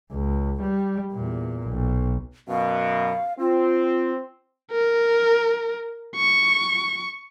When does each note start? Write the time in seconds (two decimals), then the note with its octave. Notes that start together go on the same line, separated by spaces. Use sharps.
0.13 C#2
0.62 G3
1.13 E2 A#2
1.67 B1
2.48 F#2 B2 F5
3.39 C4 F4
4.72 A#4
6.16 C#6